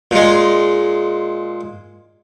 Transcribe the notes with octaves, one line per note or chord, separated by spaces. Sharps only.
A#2 G#3